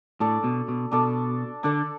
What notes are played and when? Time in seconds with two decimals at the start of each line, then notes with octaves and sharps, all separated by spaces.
0.20 A2 D4 A4 D5
0.44 B2
0.68 B2
0.92 B2 D4 A4 D5
1.63 D3 D4 A4 D5